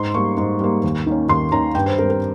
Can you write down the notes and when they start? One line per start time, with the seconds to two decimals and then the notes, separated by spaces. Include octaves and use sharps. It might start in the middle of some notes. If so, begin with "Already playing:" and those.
Already playing: G#2 C6
0.14 G3 A#3 C#6
0.37 G#2
0.60 G3 A#3
0.84 D#2
1.06 D#3 A#3 C#4
1.29 D#2 C6
1.52 D#3 A#3 C#4 A#5
1.74 G2 G5
1.86 C5
1.98 C4 A#4
2.03 G3
2.10 A#4